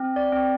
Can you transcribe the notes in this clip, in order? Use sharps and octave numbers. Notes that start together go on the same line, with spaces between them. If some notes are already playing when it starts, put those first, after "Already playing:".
Already playing: C4
D5
C4